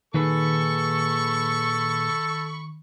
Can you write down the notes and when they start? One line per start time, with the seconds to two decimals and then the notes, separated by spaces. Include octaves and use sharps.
0.14 A#2 D#3 G#4 A4 B4 B5 C#6